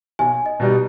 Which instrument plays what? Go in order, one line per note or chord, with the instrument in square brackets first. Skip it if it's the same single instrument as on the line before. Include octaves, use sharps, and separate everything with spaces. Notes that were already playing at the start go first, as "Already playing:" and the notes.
[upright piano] B1 [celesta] G#5
[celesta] D#5
[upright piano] B2 G3 B3 D#4